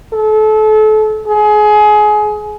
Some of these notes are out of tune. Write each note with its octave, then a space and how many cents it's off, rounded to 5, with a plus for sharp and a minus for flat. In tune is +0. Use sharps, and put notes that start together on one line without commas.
A4 -30
G#4 +25